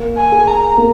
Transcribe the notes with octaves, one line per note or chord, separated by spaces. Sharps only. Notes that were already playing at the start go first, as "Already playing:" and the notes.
Already playing: A#3
G#5
G#4
A#5
A#3